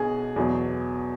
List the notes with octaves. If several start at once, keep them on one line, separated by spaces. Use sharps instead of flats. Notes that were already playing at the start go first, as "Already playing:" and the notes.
Already playing: B1 B2 G#4
E2 B2 F#3